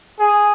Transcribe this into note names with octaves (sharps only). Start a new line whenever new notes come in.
G#4